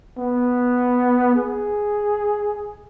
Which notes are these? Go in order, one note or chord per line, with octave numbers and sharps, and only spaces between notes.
B3
G#4